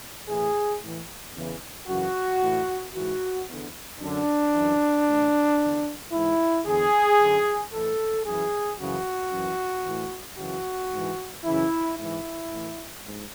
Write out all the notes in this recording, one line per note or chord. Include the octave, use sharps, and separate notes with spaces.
A2 E3 G#4
A2 E3
E2 C#3 E3
F#2 C#3 E3 F#4
A2 E3
G#2 E3 F#4
E2 D3
F#2 D3 D4
F#2 E3
A2 E3
E2 D3
G#2 E3 E4
E2 D3 G#4
F#2 D3
A2 E3 A4
F#2 E3 G#4
F#2 C#3 E3 F#4
F#2 E3
A2 E3
F#2 C#3 E3 F#4
G#2 E3
F#2 C#3 E3 E4
G#2 E3 E4
A2 E3
G#2